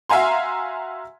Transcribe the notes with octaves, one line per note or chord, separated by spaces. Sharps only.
F#4 E5 F5 G#5 A#5 C6